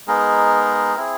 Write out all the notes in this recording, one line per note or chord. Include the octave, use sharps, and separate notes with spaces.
G#3 B3 D#4 G#4 A#4
C4 E4 G#4